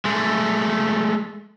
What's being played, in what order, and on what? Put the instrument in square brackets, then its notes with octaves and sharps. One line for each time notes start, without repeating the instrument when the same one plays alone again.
[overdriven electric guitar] G#3 A3